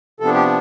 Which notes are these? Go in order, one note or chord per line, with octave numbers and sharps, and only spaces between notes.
C3 F3 B3 D4 A4
G4